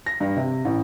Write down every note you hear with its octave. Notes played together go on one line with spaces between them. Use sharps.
A#6
G2
C3
A1